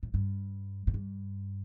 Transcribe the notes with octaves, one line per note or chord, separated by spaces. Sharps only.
A2
G2
A2
G2